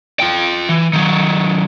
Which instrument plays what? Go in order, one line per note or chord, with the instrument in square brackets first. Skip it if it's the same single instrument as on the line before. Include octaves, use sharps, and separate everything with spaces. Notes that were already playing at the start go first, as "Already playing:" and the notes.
[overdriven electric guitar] F4 G5
E3
D#3 F#3